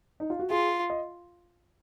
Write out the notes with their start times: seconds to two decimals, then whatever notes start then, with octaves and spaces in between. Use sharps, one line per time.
0.20 D#4
0.30 F4
0.39 F#4
0.50 F4 G#4
0.90 D#5